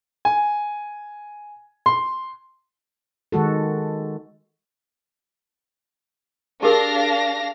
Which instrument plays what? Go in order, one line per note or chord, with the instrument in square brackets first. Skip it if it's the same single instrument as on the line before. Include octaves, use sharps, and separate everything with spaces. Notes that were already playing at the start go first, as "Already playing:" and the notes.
[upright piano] G#5
C6
[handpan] D#3 G#3 F#4 A4
[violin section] D4 F5 A#6 [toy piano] G4 G#4 A#4